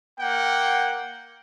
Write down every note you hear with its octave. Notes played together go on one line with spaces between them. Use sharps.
A#3 F#5 G5